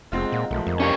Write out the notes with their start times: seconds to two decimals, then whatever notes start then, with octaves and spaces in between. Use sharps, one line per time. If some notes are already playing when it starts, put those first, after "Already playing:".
0.12 F1 G#3 C4 D#4 F4 F5 F#5
0.32 A#2 F#5
0.51 B1 D#3 F3 G#3 A3
0.67 F2
0.80 C2 C#4 D4 G4 C#5 A5